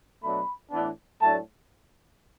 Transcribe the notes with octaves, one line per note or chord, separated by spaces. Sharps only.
B2 F#3 A3 D4 B5
A2 E3 B3 D4
A2 F#3 A3 D4 A5